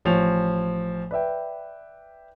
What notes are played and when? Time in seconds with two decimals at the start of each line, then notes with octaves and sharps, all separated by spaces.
0.05 A1 F3 C#5 F7
1.11 B4 D5 E5 G5